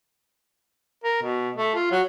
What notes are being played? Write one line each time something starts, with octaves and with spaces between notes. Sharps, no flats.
A#4
B2
A3
F4
F#3